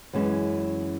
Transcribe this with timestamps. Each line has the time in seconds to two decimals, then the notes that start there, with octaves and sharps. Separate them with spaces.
0.13 F#2 E3 G#3 C#4